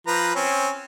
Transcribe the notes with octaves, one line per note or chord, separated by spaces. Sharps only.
F3 B4 A#5
C4 C#4